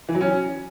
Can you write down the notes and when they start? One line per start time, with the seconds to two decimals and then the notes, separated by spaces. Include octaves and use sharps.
0.09 E3
0.15 F#3
0.21 C#4